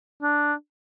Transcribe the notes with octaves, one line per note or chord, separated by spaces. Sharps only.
D4